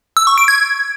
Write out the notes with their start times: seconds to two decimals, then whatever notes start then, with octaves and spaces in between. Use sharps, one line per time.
0.17 E6
0.27 C#6
0.38 D7
0.48 G#6